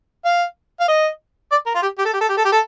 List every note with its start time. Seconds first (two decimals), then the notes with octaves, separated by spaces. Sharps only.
0.25 F5
0.80 F5
0.88 D#5
1.51 D5
1.66 A#4
1.75 F4
1.82 G4
1.98 G4
2.05 A4
2.13 G4
2.21 A4
2.29 G4
2.37 A4
2.45 G4
2.52 A4